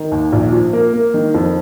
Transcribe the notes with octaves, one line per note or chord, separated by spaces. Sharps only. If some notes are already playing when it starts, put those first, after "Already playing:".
Already playing: D#3
D#2
A#1
F3
A#3
A#3
D#3
F2